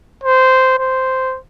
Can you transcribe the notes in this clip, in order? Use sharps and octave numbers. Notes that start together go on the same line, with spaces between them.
C5
C5